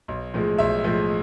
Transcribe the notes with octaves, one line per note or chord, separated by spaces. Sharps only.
B1
A2 F3 G#3
B1 E5
A2 F3 G#3